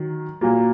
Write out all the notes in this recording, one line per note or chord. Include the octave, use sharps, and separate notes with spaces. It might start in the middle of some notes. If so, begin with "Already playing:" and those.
Already playing: D#3 F#3
A#2 F#3 A#3